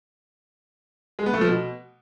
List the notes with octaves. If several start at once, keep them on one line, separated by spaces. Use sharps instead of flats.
G#3
B3
A3
F3
B2